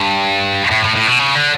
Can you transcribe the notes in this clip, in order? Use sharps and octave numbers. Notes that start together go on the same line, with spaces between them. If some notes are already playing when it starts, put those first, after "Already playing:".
Already playing: G2
A2
A2
A2
B2
C#3
D3